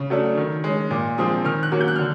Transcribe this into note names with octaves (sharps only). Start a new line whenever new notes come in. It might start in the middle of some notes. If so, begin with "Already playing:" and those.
Already playing: C#3 C#6
F#3 A3 D4
D#3
G#3 C#4
A#2 D6
F3 G#3 C4 D#6
D#3 F6
F#6
F#3 A#3 C#4
G6
F#6
F6
D3